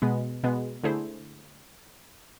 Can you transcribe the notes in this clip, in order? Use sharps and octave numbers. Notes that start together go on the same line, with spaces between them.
B2 G#3 B3
B2 G#3 B3
D3 A3 E4 G#4 C5